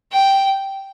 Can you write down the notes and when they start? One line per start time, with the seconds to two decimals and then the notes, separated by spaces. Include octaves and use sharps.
0.12 G5